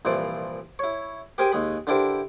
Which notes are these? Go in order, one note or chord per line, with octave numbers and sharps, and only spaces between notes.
C2 A#2 E3 F3 D5
E4 C#5
G4 G#4 A#4 C5 G5 G#5
D#2 G#3 G#4 B5
D3 D4 E4 G4 A#4 C5